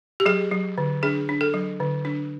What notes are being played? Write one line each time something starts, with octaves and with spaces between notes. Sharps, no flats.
G4
F#3 G#4
F#3
D3
D4 G#4
D4
A4
F#3
D3
D4